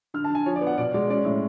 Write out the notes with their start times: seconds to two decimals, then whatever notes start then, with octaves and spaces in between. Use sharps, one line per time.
0.14 D3 F6
0.24 A5
0.30 D3 G#5
0.46 F3 C#5
0.56 D5
0.61 B3
0.67 F#5
0.78 B2 D5
0.94 G#3 D5
1.10 C#4 D5
1.25 A2